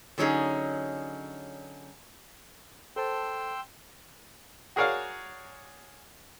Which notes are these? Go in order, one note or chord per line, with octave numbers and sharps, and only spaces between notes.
D3 F#3 C#4 D#4 G#4
A4 C5 G5 A5 C6 E6
F#4 G#4 A#4 C#5 D5 F5